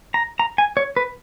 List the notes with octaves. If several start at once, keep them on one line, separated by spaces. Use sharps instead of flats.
A#5
A#5
G#5
C#5
B4